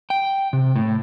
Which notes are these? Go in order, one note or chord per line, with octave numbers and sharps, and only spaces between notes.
G5
C3
A2